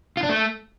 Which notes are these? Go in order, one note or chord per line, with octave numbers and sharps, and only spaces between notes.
F4
D4
A3